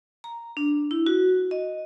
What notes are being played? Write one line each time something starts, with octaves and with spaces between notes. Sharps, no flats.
A#5
D4
E4
F#4
D#5